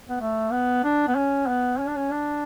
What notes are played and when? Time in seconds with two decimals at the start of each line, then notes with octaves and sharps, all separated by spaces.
0.09 B3
0.21 A3
0.52 B3
0.84 D4
1.08 B3
1.16 C#4
1.47 B3
1.79 C#4
1.88 D4
1.96 C#4
2.11 D4